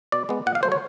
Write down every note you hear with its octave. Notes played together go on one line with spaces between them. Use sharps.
B2 D5
G#3 B3
A#2 F#5
F5
F#3 A3 C5
C#5